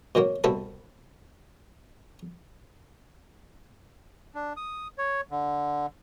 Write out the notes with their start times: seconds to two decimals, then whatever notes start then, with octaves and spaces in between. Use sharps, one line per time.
0.15 B2 D#3 F#3 A#3
0.44 C2 B2 E4 A4 B5
4.35 D4
4.57 D#6
4.98 C#5
5.31 D3